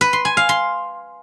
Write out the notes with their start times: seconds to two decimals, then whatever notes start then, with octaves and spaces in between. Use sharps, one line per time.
0.01 B4
0.13 C6
0.25 G#5
0.37 F5
0.49 C6